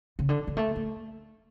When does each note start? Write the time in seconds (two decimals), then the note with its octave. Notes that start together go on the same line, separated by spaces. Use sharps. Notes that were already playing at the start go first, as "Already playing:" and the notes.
0.19 C#3
0.29 D3
0.47 F#3
0.57 A3
0.76 A3